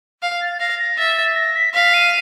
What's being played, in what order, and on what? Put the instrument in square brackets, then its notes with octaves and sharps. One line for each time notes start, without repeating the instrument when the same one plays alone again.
[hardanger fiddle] F5
[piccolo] A6
A6
[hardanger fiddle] F5 [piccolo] A#6
[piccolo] A#6
[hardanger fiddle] E5 [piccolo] A6
[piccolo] A6
A#6
B6
[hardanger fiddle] F5 [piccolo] B6
[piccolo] D#7